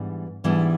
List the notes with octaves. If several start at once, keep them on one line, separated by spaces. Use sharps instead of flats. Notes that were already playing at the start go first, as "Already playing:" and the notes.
Already playing: G#2 E3 G3 B3 D4
G#2 E3 G3 B3 D4